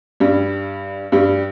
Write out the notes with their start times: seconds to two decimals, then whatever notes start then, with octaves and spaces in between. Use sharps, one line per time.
0.20 G2 G3
1.12 G2 G3